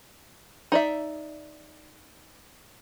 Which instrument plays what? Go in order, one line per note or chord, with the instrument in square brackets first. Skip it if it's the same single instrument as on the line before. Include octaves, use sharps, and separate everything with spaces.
[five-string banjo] D#4 D5 E5